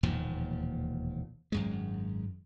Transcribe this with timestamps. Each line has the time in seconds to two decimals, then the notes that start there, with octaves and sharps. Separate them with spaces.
0.03 E1 D#2 A#2 F3
1.52 G#1 F#2 G#3